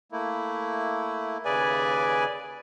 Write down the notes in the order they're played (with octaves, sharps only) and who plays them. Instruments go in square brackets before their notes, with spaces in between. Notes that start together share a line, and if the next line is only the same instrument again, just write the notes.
[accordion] A3 A#3 E4
[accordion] D#2 C#3 G#4 [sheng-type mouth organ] B4 D5 G#5